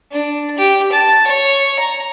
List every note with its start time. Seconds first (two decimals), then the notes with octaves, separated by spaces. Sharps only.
0.12 D4
0.58 G4
0.92 A5
1.27 C#5
1.79 A#5